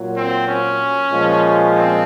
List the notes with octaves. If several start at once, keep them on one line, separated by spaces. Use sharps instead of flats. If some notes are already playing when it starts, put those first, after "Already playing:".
Already playing: A#2 F#3
C4
C#4
A#2 F3 G#3
C4